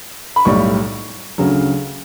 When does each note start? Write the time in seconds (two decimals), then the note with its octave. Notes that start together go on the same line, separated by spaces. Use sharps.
0.36 B5
0.45 B1 A2 G3 C#6
1.38 D2 C#3 F#3